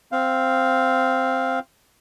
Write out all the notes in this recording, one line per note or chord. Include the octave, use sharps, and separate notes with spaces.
C4 F5